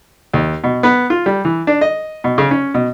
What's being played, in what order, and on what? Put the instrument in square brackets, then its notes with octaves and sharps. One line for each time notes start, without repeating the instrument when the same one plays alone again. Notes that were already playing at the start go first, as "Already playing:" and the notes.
[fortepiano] D#2
B2
B3
F4
G3
E3
D4
D#5
B2
C#3
C#4
B2